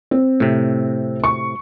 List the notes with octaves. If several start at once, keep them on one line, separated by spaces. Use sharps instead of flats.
C4
A2 C3
C#6